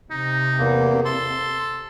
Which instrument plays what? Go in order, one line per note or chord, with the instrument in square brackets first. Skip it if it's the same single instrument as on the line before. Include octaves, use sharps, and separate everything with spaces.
[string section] C3 [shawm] D#4
[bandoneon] E2 A#3
[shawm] A4 [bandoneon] C6